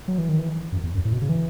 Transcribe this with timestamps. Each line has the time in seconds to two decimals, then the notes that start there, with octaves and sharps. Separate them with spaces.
0.08 F#3
0.18 E3
0.29 D#3
0.39 E3
0.72 F#2
0.83 E2
0.95 F#2
1.05 A2
1.13 B2
1.22 C#3
1.29 E3